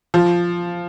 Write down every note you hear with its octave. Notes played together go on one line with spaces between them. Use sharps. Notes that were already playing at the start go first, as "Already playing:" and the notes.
F3